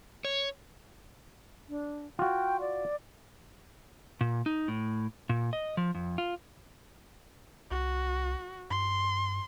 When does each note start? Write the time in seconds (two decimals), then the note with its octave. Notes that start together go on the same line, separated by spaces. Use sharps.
0.25 C#5
1.69 D4
2.19 F4 F#4 G5
2.61 D5
4.21 A#2
4.46 D#4
4.68 A2
5.29 A#2
5.53 D#5
5.77 F3
5.95 F2
6.18 F4
7.71 C2 F#4
8.70 G2 C6